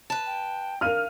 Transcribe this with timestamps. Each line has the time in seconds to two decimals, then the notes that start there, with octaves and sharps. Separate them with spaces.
0.10 B4 A5
0.26 G5
0.81 E3 D4 A#4 F5 F6 D#7